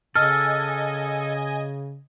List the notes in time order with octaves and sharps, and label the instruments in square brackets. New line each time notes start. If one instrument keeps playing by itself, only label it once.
[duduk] C#3 [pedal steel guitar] A4 [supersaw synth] D#5 G#5 [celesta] F6